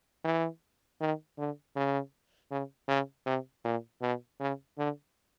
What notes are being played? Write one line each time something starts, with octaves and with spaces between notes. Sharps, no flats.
E3
D#3
D3
C#3
C#3
C#3
C3
A#2
B2
C#3
D3